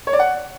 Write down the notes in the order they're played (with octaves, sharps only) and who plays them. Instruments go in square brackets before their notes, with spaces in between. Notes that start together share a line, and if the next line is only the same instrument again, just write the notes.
[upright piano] C#5
D5
F#5